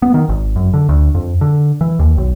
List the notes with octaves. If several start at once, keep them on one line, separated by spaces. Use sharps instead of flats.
B3
D#3
G#1
F#2
D3
D2
F2
D3
E3
D#2
B1